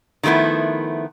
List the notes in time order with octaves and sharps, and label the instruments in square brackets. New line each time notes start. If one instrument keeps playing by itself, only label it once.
[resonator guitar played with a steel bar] D#3 F3 A3 B3 E4